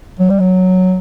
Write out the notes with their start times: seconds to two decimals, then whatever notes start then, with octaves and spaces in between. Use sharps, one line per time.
0.19 F#3
0.30 G3
0.40 F#3